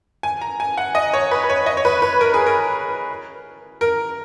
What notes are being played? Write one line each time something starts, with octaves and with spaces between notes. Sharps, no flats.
G#5
A#5
G#5
F#5
D#5
C#5
B4
B4
C#5
D#5
C#5
B4
B4
A#4
G#4
A#4
A#4